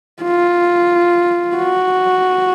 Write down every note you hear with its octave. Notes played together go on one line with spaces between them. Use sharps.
F4
F#4